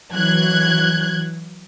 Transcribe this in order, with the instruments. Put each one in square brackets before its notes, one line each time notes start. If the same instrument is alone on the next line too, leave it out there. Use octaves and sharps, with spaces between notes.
[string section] E3 F#3 F#6 G#6